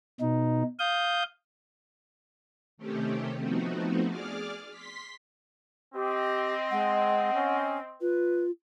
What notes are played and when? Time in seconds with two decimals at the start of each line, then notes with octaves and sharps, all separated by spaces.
0.20 B2 D#4
0.79 F5 D#6 G6
2.77 C3 D#3 A3 C4 C#4 G4
3.38 F3 A3 B3 C4 D#4 F#4
4.07 G#4 D5 D6 F6
4.70 C6 B6
5.95 C4 G4 D#5
6.71 G#3 F#5
7.34 C#4
8.01 F4 B4